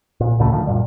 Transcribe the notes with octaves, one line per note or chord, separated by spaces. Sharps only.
A#2
D2 A#2 C#3 A3
D3 D#3 F3 A3
F#2 A#2 G3